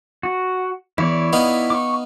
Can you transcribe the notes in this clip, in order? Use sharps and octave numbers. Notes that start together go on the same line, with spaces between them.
F#4
E2 E4 C#5 D5
B3 D#4 F5
C#6 D6